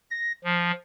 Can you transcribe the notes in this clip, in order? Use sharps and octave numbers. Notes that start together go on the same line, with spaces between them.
A#6
F3